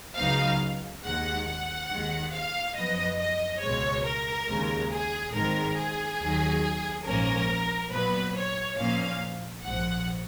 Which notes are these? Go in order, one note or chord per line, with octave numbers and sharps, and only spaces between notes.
C#2 C#3 F#3 B3 D#4 F5
D#2 D#3 G#3 F#5
F#5
D#2 D#3 G#3
F5
F#2 F3 B3 D#5
D#5
C#2 B2 G#3 C#5
A#4
D#2 C#3 G#3
G#4
G#1 G#2 D#3 G#3 A#4
G#4
D#2 D#3 F#3
A#1 G#2 F3 A#3 C#4 A#4
A#2 F#3 B3 B4
C#5
A#2 F3 A#3 C#4 F5
A#1 G#2 F3 F#5